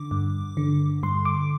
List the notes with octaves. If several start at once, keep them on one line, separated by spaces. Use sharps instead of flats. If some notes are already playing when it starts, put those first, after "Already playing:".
Already playing: D3 D6
G2
D3
G2 C6
D6